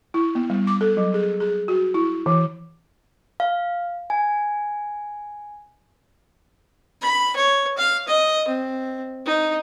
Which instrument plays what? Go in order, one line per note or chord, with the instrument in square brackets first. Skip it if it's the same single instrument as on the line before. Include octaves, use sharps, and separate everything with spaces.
[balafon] E4
B3
G3
D6
A4
F#3
G#4
G#4
F#4
E4
E3
[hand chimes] F5
G#5
[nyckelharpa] B5
C#5
F5
D#5
C4
D#4